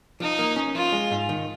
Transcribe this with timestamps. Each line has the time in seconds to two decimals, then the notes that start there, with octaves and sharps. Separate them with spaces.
0.20 F3 D#4
0.39 A#3
0.56 C#4
0.75 F3 F4
0.92 G#3
1.11 G#2
1.29 D#3